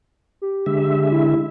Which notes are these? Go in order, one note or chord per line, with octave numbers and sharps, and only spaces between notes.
G4
D3 G#3 E5
E4